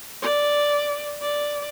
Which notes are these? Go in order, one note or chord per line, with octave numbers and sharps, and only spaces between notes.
D5
D5